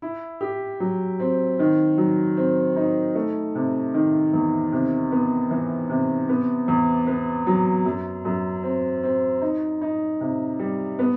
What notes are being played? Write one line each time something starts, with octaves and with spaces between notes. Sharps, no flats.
E4
G4
F#3
C4
D#3
F#3
C4
D#4
A3
C3
D#3
E2
C3
B3
E3
C3
B3
E2
B3
F#3
F#2
F#2
C4
C4
D#4
D#4
C3
G3
B3